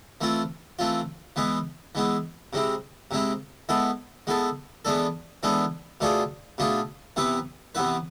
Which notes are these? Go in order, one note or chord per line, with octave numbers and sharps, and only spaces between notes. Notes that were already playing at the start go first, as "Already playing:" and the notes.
E3 A3 C4 F4
E3 A3 C4 F4
E3 G#3 B3 E4
E3 G#3 B3 E4
C3 G#3 C4 E4
C3 G#3 C4 E4
G#3 B3 E4 A4
G#3 B3 E4 A4
E3 G#3 B3 D4 A4
E3 G#3 B3 D4 A4
B2 A3 D4 F4 G#4
B2 A3 D4 F4 G#4
C3 E3 B3 E4 B4
C3 E3 B3 E4 B4